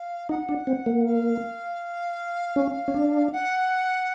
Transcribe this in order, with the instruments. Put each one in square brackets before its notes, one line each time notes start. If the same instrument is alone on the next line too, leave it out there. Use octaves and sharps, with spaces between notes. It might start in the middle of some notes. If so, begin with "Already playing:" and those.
Already playing: [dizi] F5
[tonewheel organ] D#4 [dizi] F#5
[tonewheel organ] D4
C4
A#3
[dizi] F5
[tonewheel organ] C#4
C#4
D4
[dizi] F#5